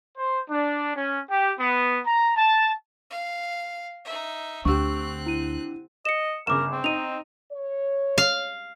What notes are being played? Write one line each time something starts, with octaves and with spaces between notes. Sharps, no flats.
C5
D4
C#4
G4
B3
A#5
A5
F5
D#4 E5
D2 D3 C4 G4 C#6 E6 F#6
E4 D#7
D#5 C#7 E7
G1 C#3 A#4 D6 E7
C4
D#4 D#7 F7
C#5
F5